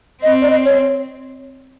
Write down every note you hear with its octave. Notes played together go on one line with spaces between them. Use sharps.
C4 D#5
D5
D#5
C#5